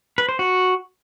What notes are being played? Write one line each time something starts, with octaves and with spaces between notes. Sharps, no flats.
B4
C5
F#4